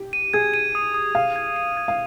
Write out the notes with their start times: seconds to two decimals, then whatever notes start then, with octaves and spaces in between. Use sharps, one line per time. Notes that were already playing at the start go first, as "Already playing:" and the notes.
Already playing: G4
0.13 D#7
0.33 G#4 G#6
0.54 D#7
0.75 D#6
0.94 D#6
1.15 F5 G#6
1.36 G#6
1.56 D#7
1.77 G#6
1.88 F5